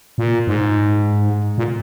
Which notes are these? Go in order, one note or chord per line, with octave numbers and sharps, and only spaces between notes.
A#2
G#2
A#2